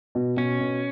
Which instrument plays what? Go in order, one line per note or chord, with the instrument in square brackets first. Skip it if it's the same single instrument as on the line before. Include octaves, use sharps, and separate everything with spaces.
[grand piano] B2
[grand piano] B2 [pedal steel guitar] C#4
[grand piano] B2